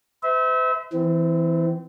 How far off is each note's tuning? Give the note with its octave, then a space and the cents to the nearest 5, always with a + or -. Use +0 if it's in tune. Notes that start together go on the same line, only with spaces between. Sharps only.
C5 -45 E5 -30
E3 +0 C4 -30